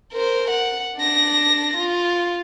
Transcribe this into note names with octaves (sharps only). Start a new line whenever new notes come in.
A#4 C5
F#5
D4 A#6
F4